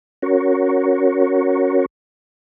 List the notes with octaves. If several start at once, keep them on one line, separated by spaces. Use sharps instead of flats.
C#4 F#4 A#4 C#5